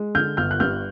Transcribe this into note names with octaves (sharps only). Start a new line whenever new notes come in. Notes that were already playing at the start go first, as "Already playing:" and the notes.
Already playing: G#3
D3 F6 G6
G1 F6 G6
F#6
G2 F6 G6